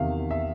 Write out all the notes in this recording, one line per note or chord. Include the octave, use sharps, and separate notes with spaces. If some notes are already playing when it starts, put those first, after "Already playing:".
Already playing: E2 C3 D#3 E5 F5
E5